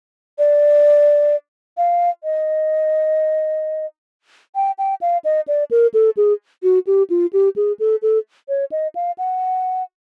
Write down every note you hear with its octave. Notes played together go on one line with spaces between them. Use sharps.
D5
F5
D#5
G5
G5
F5
D#5
D5
A#4
A4
G#4
F#4
G4
F4
G4
G#4
A4
A4
C#5
D#5
F5
F#5